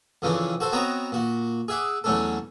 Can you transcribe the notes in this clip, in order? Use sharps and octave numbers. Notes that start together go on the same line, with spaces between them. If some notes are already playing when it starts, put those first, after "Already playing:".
F2 C#3 E3 C#4 D4
F#4 A4 C5
B3 C4 F#4 C#5 D#5 A#5
A#2 F#4
G#4 E5 F#5 D6
E2 F#3 A3 C#4 D4 A4